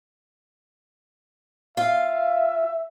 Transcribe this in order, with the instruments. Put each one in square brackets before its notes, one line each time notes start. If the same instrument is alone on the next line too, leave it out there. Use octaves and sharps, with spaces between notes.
[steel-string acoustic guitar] F4 F5 [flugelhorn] E5